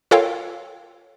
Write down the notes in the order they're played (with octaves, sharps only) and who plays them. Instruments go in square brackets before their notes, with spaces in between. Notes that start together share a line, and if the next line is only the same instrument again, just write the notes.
[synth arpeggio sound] F4 A4 A#4 C#5 F5 G5